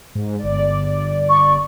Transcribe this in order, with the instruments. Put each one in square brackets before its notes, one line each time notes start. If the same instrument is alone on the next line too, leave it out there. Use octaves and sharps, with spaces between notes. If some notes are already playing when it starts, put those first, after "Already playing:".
[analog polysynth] G#2
G1 D5
[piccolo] C#6